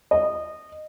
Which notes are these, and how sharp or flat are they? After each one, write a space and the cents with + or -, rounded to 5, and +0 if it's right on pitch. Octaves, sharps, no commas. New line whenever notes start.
D#5 -20